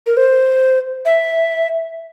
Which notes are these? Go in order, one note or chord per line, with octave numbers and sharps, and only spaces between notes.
A#4
C5
E5